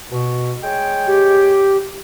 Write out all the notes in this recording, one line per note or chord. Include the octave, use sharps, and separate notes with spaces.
B2
G#3 C#5 G5
G4